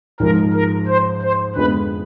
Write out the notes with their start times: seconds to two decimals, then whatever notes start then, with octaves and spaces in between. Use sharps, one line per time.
0.20 G#2 F3 G#3 A#4
0.54 A#4
0.87 C5
1.22 C5
1.55 F2 D3 F3 G#3 B3 B4